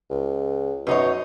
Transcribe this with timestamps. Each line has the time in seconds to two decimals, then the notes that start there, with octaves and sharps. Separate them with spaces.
0.10 C#2
0.87 F#2 B2 D#4 C#5